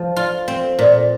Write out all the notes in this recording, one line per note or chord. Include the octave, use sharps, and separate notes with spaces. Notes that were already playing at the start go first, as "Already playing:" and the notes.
Already playing: F3
F4
C4
A#2